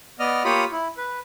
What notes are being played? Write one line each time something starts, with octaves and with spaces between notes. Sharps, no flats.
B3 D5 D#5 F6
A#3 F4 G4 C#5 B5 D#6
E4
B4